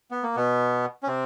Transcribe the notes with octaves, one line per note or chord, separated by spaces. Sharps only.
B3
A#3
B2 B3
C#4
C3 C4